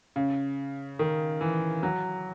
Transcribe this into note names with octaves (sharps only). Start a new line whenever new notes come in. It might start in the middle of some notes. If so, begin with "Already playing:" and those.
C#3
D#3
E3
F#3